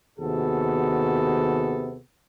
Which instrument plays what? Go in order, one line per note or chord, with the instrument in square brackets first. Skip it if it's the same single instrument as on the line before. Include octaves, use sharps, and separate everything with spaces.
[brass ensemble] D#2 C3 B3 F#4 G#4 A4